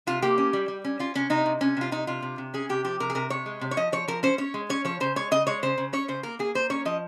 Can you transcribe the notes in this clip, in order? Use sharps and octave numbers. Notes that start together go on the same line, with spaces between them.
C3 F4
A#3 G4
C#4
G3
G3
C#4
C#4 F4
C3 C#4
C3 D#4
C3
C3 C#4
C3 F4
C3 D#4
C3 F4
C3
C3
C#4 G#4
C3 G4
F3 G4
C3 A#4
G#4
C3 A#4
C3 C#5
G#3
C3
C#5
F3 D#5
F3 C#5
F3 A#4
C#4 C5
C#4 C#5
G#3
C#4 C#5
F3 C#5
C#3 C5
G#3 C#5
C#3 D#5
G#3 C#5
C#3 C5
C#3
C#4 C#5
C#3 C5
A#3 A#4
A#3 G#4
A#3 C5
C#4 C#5
F3 D#5